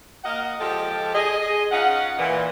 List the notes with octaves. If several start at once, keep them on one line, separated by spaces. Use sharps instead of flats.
A#3 D#5 F5 F#5
F3 G#3 G4 A4
G#4 D#5
C#4 D#4 F4 F#5
A#2 E3